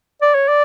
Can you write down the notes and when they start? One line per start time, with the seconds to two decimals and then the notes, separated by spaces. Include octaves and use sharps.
0.22 D5
0.35 C#5
0.48 D5